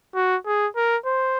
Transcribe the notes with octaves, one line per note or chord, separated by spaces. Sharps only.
F#4
G#4
A#4
C5